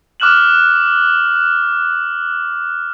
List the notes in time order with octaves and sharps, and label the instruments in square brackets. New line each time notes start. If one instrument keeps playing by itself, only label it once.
[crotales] D6 F6 F#6 E7 F#7